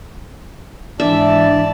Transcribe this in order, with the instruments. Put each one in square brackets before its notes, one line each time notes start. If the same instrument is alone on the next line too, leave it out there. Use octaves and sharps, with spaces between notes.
[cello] G#2 E3 [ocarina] D4 [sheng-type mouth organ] D5 A5 [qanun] E5